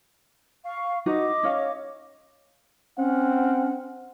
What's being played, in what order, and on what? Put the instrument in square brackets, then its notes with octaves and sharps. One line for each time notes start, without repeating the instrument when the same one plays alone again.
[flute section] F5 C#6
[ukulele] D#4 F#4 B4 [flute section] D#5 D6
[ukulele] C#4 C#5 F5
[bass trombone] C4 [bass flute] C#4 [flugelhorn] F#5